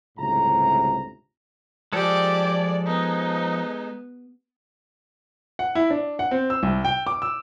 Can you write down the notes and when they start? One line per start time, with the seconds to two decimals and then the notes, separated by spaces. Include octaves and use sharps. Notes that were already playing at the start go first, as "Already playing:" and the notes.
0.18 G1 C#2 A2 C3 A#5
1.93 F3 G#3 G4 A4 D5 D6
2.86 B3 D#4
5.59 F#5
5.75 E4
5.90 D4
6.19 F#5
6.31 C4
6.50 E6
6.63 C2
6.85 G5
7.07 D6
7.22 E6